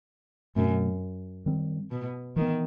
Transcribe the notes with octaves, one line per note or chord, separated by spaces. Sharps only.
F#2 B2 F#3 A3 C4
D#3 G3 C4
B2
D#3 E3 B3